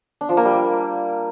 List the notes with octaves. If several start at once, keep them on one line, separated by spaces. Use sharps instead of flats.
D4
F3
A#3
G3